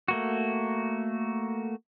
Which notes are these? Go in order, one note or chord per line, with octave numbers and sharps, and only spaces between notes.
A3 A#3 F#4